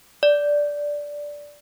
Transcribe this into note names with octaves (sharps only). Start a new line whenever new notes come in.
D5